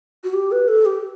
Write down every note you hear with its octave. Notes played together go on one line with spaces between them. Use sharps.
F#4
G4
B4
A4
G4